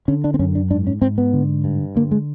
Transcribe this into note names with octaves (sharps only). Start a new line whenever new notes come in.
D3 C#4
D4
C4
F#2 C#4
D4
G#2 D4
C#4
G#2 C4
B3
D3
G2
D3 A#3
G#3